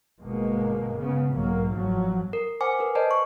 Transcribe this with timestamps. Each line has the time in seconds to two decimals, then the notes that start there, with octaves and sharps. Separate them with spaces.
0.20 G1 B2 G#3 A#3
0.98 C#3 B3
1.31 B1 G#2 F#3 A#3
1.74 G1 F3 F#3
2.33 A#4
2.61 C5 F#5 G#5 D6
2.79 A#4 B4
2.95 A#4 C5 D5 D#5 A5
3.11 C#6